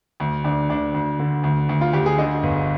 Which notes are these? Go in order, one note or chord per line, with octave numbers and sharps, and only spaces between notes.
D2
D2 D4
D2 D4
D2
D3
D2
D2
F4
D2 G4
G#4
D3 D#5
G1